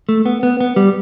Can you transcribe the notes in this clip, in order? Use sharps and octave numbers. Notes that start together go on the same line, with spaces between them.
A3
B3
B3
B3
G3